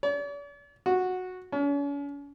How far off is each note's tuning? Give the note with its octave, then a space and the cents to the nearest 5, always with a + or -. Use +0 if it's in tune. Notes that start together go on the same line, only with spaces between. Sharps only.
D5 -45
F#4 -10
C#4 +40